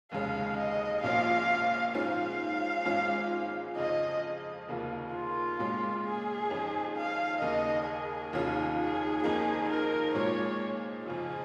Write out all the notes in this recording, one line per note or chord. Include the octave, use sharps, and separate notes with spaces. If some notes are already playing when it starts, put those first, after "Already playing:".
F1 D#2 C#3 G#3 C#4 F5
D#5
A#1 A#2 F3 C#4 F4 F5
G#2 F3 C#4 F4 F5
G#1 G#2 G#3 C#4 F4
F2 C#3 F3 D#5
F1 D#2 C#3 A#3 F4
F4
A#2 G#3 C#4
G#4
F2 D#3 C#4
F5
D#2 C#3 A#3 D#4 D#5
G#4
F1 D#2 D#3 C#4 F4
G#4
F2 D#3 A#3 D#4 G#4
A#4
A#2 F3 G#3 C#5
F2 C#3 F3 G#4